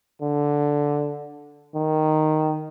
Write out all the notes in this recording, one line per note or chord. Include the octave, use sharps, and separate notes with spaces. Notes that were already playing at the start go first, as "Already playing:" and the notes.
D3
D#3